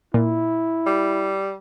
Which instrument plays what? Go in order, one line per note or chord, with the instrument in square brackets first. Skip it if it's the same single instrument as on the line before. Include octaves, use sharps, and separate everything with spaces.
[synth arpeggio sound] A#2 [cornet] E4
[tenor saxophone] G3